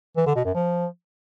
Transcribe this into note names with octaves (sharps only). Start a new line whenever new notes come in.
E3
D3
B2
F#2
F3